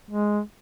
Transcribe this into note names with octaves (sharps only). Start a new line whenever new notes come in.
G#3